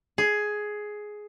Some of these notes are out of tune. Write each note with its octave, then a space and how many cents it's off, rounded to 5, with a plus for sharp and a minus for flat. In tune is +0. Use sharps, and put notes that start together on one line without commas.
G#4 +10